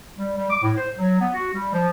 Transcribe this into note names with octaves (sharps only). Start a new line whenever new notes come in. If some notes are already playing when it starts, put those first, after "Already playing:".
G3
G3
D6
A2
C5
F#3
B3
F#4
G3
F3